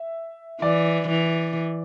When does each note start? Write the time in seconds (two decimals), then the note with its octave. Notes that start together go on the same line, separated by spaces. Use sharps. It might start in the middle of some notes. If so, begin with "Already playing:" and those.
Already playing: E5
0.61 E3 D5
1.08 E3